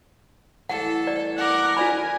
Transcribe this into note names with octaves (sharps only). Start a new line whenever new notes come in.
E3 G3 A3 A4 F#5
D5
A#4 F#5 D6
F4 D5 G#5 B5